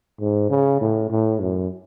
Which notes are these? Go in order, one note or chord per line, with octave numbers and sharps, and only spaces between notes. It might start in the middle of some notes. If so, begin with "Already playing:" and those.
G#2
C#3
A2
A2
F#2